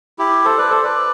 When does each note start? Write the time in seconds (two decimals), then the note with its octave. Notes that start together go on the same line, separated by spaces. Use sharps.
0.19 E4 G4
0.45 A4 C5
0.58 B4 D5
0.71 A4 C5
0.84 B4 D5